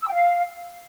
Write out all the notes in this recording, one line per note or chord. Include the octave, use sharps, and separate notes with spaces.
E6
G5
F5